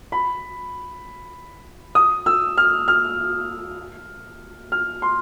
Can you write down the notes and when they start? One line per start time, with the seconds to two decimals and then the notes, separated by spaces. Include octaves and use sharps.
0.12 B5
1.95 D#6
2.26 E6
2.58 F6
2.88 F6
4.72 F6
5.02 C6